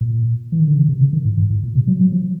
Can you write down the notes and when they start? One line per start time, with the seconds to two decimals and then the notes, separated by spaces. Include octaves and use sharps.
0.01 A#2
0.52 E3
0.60 D#3
0.68 D3
0.76 C#3
0.88 C3
1.01 C#3
1.13 D#3
1.25 A2
1.38 G#2
1.50 A2
1.63 A#2
1.75 C3
1.87 F#3
2.01 F#3
2.12 F3